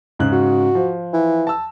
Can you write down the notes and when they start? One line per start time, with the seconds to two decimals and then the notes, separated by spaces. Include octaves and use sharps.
0.19 G#2 C#3 F#6
0.32 F#4
0.75 F3
1.13 E3
1.47 A5 E6